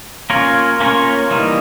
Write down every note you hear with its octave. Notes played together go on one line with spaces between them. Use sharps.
A#3 C#4 F4 A#4 C#5
A#3 C#4 F4 A#4 C#5
E3 G3 A#3 D#4